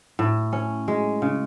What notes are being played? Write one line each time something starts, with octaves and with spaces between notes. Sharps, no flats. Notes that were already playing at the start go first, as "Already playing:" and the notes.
A2
C#4
G#3
C#3